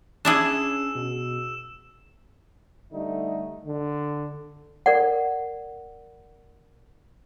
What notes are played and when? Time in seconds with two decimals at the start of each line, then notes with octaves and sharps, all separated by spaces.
0.25 C#4 D4 E4 G#4 E6 E7
0.95 B2
2.92 D3 G3 A3 D#4
3.65 D3
4.86 A#4 D5 F#5